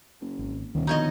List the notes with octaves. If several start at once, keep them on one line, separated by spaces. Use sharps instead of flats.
F#1
G#1
D#1 D2 B2 D#3
B2 D3 F3 D#4 C#5 D#5